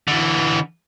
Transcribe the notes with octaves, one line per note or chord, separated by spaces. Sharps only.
D3 E3